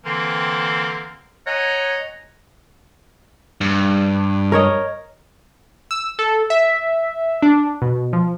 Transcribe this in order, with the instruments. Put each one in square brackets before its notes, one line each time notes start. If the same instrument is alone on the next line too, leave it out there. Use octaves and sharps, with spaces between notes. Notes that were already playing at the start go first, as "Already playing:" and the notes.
[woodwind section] D3 E3 A#3 C4
C#5 D#5 F#5 G#5 A#5
[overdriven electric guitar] G2
[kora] A#4 C#5 D#5
[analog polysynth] E6
A4
E5
D4
B2
F3